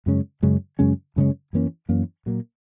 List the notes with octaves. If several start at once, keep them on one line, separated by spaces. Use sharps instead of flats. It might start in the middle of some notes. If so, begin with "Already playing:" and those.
F#2 C#3 G#3 C#4
F#2 C#3 G#3 C#4
F#2 C#3 G#3 C#4
F#2 C#3 G#3 C#4
F#2 E3 A#3 C#4
F#2 E3 A#3 C#4
A#2 F#3 A#3